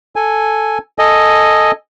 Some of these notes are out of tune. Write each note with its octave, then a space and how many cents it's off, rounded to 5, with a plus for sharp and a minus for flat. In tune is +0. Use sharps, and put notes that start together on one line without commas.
A4 +0 G#5 +0
A4 +5 D#5 +0 G#5 +0